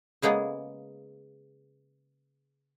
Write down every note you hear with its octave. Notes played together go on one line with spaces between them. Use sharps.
C#3 G#3 A#3 B3 G#4